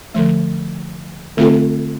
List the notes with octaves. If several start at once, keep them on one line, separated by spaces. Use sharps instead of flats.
D3 F3 A3
D3 A3 C4 F4 A4